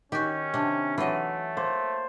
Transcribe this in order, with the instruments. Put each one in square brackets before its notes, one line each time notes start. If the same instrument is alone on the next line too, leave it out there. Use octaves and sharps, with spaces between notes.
[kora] D#3 [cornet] C#4 [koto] F#4 G4
[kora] C3 [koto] D4
[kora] E3 F#3 [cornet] A3 [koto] F4 D#5
[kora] A#3 [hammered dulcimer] C5